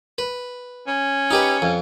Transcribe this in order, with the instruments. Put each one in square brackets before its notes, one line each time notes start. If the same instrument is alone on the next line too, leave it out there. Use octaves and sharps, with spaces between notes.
[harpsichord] B4
[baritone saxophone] C#4
[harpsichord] D#4 G4 B4
F2